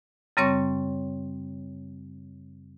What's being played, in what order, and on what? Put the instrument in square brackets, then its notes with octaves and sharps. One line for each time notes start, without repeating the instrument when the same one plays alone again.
[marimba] F#2 C#3 G3 C4 C#5 C#6